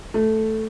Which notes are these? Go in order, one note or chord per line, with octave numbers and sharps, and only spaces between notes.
A3